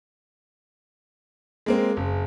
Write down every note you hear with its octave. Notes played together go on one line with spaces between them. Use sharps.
G#3 A#3 C4
F#1